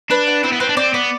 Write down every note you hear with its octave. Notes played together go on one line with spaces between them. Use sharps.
D4 B4
F#5
C4 E4
B3
C4 B4
D4
C4 D5
B3 D5